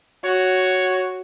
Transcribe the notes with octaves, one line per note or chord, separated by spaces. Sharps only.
F#4 C#5